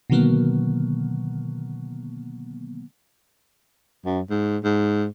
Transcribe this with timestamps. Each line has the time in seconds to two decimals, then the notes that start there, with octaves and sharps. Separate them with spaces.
0.10 B2 D3 D#3 F#3 A#3 B3
4.05 F#2
4.30 G#2
4.64 G#2